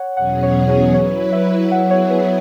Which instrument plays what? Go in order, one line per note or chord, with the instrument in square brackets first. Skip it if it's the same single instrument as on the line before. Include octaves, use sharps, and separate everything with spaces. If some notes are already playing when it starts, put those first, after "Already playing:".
Already playing: [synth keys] C#5 F#5
[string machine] E2 B2 F#3 C#4 G#4 [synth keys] F#5
[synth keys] C#5
C#5
[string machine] F#3 E4 B4 [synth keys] C#5
[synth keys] E5
[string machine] F#3 B3 E4 G#4 [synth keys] F#5
[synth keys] C#5
B4